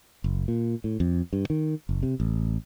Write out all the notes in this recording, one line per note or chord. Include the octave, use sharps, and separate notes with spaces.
F#1
A#2
A2
F2
G2
D#3
F#1
C3
A1